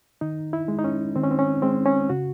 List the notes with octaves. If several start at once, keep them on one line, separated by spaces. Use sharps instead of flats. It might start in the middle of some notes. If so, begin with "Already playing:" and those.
D#3 D#4
E4
G#3
D#4
C#4
D#3 C4
C#4
C4
C#4
G#3 C4
C#4
C#3 F#4